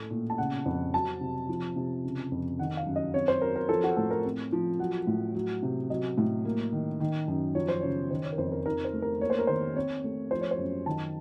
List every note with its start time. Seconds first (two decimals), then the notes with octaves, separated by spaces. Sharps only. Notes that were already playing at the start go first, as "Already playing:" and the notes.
Already playing: A2 A3
0.11 A#2
0.30 A5
0.38 C#3 F#5
0.66 F2
0.94 F#3 A5
1.21 C3
1.49 F3
1.76 C3
2.04 C#3
2.32 F2
2.59 D#3 F#5
2.77 F5
2.86 F#2
2.96 D#5
3.14 C4 C#5
3.28 C5
3.42 F#3 A#4
3.56 A#4
3.69 F3 A4
3.84 F#4
3.97 A2 A4
4.11 A#4
4.25 C4
4.52 F3
4.79 F#3 F#5
5.07 A2
5.35 F#3
5.63 C3
5.90 F#3 D#5
6.18 A2
6.45 A#3
6.72 D#3
7.00 D#3
7.28 F#2
7.55 F3 C#5
7.69 C5
7.81 C#3 C#5
8.11 D#3 C5
8.24 C#5
8.33 A#4
8.38 F2 C5
8.52 A#4
8.66 D#4 A#4
8.85 C5
8.94 A3
9.02 A#4
9.21 A#3 C#5
9.30 C5
9.39 A#4
9.47 D#3 C5
9.76 C4 C#5
10.04 A3
10.31 F3 C5
10.41 C#5
10.51 C5
10.59 F#2
10.86 D#3 A5